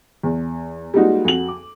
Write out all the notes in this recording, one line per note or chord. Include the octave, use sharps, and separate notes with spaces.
E2
G3 G#3 A#3 D#4 F4 F#4
F2 F#4 F#7
D6